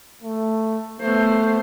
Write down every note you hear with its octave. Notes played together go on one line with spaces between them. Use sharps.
A3
A3 B3 C5